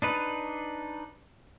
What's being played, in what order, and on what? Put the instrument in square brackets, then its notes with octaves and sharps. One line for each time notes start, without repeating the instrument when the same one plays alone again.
[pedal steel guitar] D4 D#4 B4